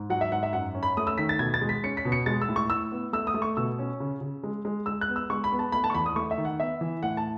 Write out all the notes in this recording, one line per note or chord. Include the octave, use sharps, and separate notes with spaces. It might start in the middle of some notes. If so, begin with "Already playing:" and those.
Already playing: G#2
F#3 F#5
E5
G#2 F#5
E5
F#2 F#5
C#4
B5
A3 D#6
E6
D#3 B6
A6
B2 G#6
A6
G#3
B6
C#4 C#7
B6
B2
C#7
G#3 A6
E6
A2
C#6
A2 E6
B3
A3 E6
D#6
A3
C#6
B2 E6
C#4
C#3
C#3
G#3
G#3
G#3 E6
F#6
B3
E6
G#3 C#6
B5
B3
A5
A3 B5
A5
C#6
E2 B5
D#6
A3 C#6
E5
D#3
F#5
B3 E5
E3
A2 F#5
A5